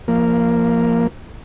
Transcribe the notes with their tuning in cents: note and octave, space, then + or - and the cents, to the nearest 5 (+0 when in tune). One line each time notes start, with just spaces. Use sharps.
F3 -25 A#3 +0